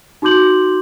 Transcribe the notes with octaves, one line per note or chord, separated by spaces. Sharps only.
D#4 F#4 C6 D6 G6 F#7